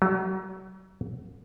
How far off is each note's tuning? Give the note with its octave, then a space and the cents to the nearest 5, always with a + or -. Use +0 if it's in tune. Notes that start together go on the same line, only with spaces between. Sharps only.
F#3 +35